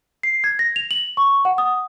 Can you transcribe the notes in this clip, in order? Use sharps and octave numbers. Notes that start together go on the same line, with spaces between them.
C7
G#6
A#6
F7
F#7
C#6
F#5
D#6